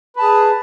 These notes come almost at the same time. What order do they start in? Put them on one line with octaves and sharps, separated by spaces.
B4 A5 G#4